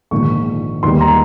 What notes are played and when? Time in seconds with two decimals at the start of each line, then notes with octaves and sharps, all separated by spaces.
0.11 A#1 G#2 D#3 C#6
0.83 D#2 D#3 G3 C6
1.01 A#5